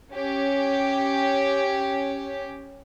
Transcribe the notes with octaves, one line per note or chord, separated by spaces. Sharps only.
C#4 G4